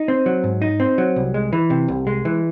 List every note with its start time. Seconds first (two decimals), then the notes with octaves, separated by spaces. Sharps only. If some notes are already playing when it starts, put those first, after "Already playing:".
Already playing: D#4
0.08 C4
0.26 F#3
0.44 G#2
0.62 D#4
0.80 C4
0.98 F#3
1.16 C2
1.34 G#3
1.53 E3
1.70 C3
1.88 C2
2.07 G#3
2.25 E3